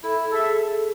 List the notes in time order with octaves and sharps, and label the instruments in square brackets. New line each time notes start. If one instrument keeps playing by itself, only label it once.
[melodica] E4 [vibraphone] A4
[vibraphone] A4
[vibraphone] G#4 [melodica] A4 E5